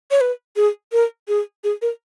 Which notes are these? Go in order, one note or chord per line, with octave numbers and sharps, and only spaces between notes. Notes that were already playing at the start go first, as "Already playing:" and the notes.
C#5
B4
G#4
A#4
G#4
G#4
A#4